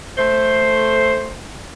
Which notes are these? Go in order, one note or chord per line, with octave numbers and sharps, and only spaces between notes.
A3 C5